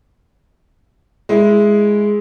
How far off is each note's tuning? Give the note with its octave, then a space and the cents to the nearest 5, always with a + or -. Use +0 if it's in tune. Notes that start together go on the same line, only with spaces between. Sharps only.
G#3 +0 E4 +0